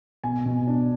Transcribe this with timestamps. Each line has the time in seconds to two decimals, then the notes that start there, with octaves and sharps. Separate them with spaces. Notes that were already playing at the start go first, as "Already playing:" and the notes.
0.24 B2 G#5
0.46 B2
0.67 D4